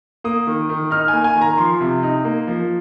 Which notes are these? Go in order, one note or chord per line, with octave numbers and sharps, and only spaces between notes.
A#3 D#6
D#3
D#3
D#4 F6
A#3 G#5
G#5
D#3
A#5
F3 C6
C3
D#4
A#3
F3